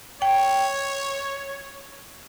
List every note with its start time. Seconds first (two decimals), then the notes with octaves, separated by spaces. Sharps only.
0.22 C#5 G5